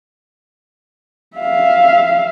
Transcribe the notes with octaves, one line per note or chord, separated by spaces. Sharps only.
E5 F5